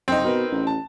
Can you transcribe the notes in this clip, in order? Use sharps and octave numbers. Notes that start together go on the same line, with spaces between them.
F#1 C4 D#4
B2 A#4 B4
A1
A5